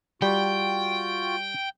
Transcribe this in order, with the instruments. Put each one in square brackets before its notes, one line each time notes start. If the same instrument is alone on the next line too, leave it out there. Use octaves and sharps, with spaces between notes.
[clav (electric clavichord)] G3 [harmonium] F4 F#4 [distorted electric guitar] G5